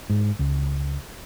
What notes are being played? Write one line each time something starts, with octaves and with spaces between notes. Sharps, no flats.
G#2
C#2